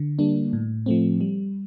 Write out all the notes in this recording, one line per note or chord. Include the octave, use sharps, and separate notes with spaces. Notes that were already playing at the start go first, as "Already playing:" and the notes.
Already playing: D3
G3 A#3 D4
A2
F3 A3 C4
G3